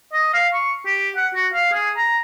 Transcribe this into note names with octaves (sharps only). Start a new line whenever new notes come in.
D#5
F5
C#6
G4
F#5
F#4
F5
G#4
A#5